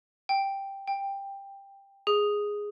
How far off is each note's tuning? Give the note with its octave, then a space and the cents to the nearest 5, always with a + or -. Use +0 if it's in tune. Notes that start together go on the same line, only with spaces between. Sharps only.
G5 +0
G5 +10
G#4 -5